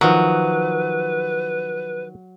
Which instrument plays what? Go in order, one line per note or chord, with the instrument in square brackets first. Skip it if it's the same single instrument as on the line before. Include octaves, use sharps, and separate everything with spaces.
[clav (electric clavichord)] D#3 F3 [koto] F#3 [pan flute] B4